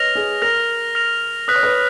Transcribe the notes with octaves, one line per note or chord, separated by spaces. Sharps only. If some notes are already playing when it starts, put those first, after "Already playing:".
Already playing: B4 C#5 D#5 F6 A#6 F7
G#4
A#4 F6 A#6 F7
F6 A#6 F7
B4 D#6 F#6 B6
C#5
B4